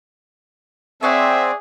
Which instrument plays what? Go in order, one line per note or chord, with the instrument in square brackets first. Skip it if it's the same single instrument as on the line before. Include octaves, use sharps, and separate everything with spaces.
[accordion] C4 [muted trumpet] G#4 [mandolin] C#5 D5 F#5 [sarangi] E5